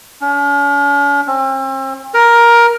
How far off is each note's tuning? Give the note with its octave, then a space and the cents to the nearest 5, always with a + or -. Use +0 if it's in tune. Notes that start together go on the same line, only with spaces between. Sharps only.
C#4 +45
C4 +40
A#4 +10